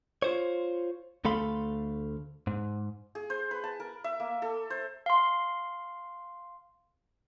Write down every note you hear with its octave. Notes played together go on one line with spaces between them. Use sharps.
F4 C5 C#5
D2 A3 A4 F5 B5 C6
G#2
G#4
C5
B4
A5
A#4
E5
A#3
A4
C5
F5 C6